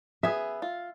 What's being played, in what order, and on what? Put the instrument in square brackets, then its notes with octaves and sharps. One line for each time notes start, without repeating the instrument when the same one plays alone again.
[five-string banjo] B3 G#4 [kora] E5
[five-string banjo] F4